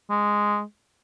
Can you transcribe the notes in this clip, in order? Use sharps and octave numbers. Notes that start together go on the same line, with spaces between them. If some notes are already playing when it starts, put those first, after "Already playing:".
G#3